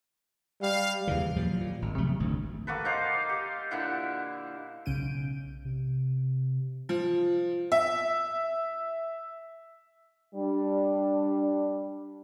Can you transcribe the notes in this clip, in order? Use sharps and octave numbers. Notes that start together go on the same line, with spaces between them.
G3 F5
D#2 C#3 E3
A#2 F3 F#3
A#2
G#1
C3 F3 F#3 A3
G#1 D2
A#3 F#4 A4 B4
D#4 C5 F5 D6
G4
A#2 D3 E4 F#5
B1 C#3 C#4 G6 D7 D#7
C3
F3
E5
G3 D4